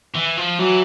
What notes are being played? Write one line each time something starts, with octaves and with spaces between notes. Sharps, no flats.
E3
F3
E3 F#3